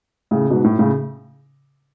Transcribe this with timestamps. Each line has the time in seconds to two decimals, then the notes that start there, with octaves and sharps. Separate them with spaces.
0.31 A2 C#3
0.50 G#2 B2
0.64 A2
0.79 A2 C#3